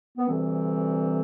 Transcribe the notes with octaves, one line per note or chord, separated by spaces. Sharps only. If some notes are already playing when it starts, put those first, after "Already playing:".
B3
D2 C3 E3 G3 C4